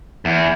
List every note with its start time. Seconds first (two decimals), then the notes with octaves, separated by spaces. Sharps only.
0.25 E2